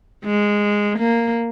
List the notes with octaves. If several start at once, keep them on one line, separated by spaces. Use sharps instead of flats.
G#3
A#3